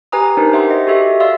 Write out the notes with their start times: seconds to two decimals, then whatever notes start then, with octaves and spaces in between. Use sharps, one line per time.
0.12 G4 B4 G#5 A#5 D#6
0.37 D4 D#4 A#4 C5
0.53 G4 C5 E5 F#5 C6
0.70 D#5
0.87 F#4 G4 A4 E5
1.20 D5 E5 F5 C6 E6